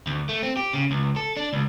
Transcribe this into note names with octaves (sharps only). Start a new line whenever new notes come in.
D2
A3
C4
G4
C#3
C#2
A4
D4
C#2